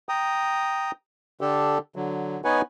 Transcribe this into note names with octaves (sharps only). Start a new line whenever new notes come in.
G5 A#5 D#6
D3 D4 G4 A4
D3 F#3
B3 D#4 B4 C#5 F#5 G#5